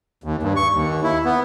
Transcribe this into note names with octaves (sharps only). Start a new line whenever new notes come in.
D#2
G2
C#6
D#2
E4
B3